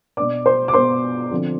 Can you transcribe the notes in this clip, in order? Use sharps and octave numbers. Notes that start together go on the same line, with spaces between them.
B2 B3 D4 D5 D6
C5 C6
D6
B2 B3 D4 C5 C6
D3 F3 C4